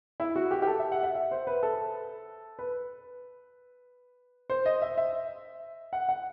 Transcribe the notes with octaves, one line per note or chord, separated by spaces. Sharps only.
E4
F#4
G4
G4
A4
E5
F#5
E5
E5
C5
B4
A4
B4
C5
D#5
E5
E5
F#5
F#5